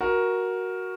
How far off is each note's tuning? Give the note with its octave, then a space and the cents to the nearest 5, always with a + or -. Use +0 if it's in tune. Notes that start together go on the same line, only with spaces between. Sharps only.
F#4 +0 A#4 +10